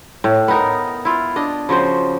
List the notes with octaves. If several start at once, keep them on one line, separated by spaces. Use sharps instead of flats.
A2
B3 D#4 A#4
E4 F4
D4 D#5
C#3 F3 F#4 C5